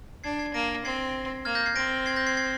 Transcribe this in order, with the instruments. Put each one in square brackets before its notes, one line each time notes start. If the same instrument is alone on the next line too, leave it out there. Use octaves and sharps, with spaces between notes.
[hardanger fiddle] D4 [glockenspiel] G#6 C7
[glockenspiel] G#6 C7
[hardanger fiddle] A#3 [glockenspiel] A#6 D7
[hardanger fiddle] C4 [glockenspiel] G#6 C7
[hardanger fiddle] A#3 [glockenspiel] F6 G#6
[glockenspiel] G6 A#6
G#6 C7
[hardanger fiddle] C4 [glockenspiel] A#6 D7
[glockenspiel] G#6 C7
G6 A#6
G#6 C7
G#6 C7